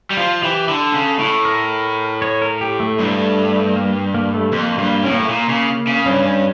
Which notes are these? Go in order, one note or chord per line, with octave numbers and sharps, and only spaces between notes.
G3
F3 F4
E3 G4
D3 A4
C#3
A2
A#4
C#5
A#4
G4
A3
G2 A3
A#3
A#3
A3
F2 A#3
G2 A#3
A2 C#4
A#3
A3
A#2 A#3
C#3
C#3
G2 C#4
C#4